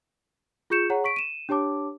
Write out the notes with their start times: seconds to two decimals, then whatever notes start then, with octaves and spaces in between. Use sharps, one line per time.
0.70 F4 G#4 C#6 G6 C#7 E7
0.90 G#4 C#5 F#5 A#5
1.04 C#6 B6 D7
1.16 D#7 E7
1.49 D4 G4 C#5 A5 D6